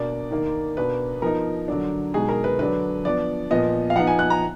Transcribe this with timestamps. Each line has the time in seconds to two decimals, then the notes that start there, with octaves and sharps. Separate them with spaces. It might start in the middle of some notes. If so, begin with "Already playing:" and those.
Already playing: B2 A#3 D4 D5
0.31 D#3 A#3 D#4
0.77 B2 A#3 D4 B4
1.22 F3 B3 D#4 A#4
1.68 D3 F#3 D4
2.14 B2 G#3 D#4 G#4
2.29 A#4
2.44 B4
2.59 D3 F#3 D4 B4
3.05 F3 B3 D4 D5
3.51 A#2 F3 B3 D#5
3.90 F5
3.96 F3 B3 D#4 F#5
4.07 G#5
4.19 F#6
4.30 A#5